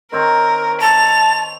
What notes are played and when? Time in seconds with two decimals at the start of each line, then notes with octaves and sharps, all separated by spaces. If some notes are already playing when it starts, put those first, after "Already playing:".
0.12 D#3 C4 A#4 C#5
0.81 A5 F7